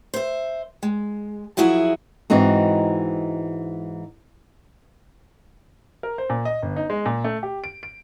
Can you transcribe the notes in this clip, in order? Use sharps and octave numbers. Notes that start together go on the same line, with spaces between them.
C5 E5
G#3
F3 F#3 E4 F#4 G#4 E5
G#2 E3 C4 D#4 F#4
A#4
C5
A#2
D#5
G1
D#4
G#3
A#2
A3
G4
D7
D7